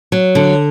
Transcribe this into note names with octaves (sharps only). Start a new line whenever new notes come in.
F#3
D3